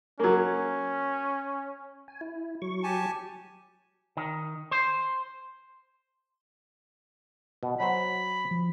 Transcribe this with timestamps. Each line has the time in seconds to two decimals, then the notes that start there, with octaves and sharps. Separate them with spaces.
0.20 F#3 A#3 C#4
2.08 G#5
2.21 E4
2.62 F#3 C#6
2.83 G4 G#5 A5
4.17 D#3
4.71 C5
7.63 B2
7.80 F#3 F#4 C5 B5
8.51 F3